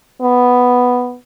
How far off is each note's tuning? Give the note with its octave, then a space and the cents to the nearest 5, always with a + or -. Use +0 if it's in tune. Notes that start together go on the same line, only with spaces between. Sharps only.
B3 +0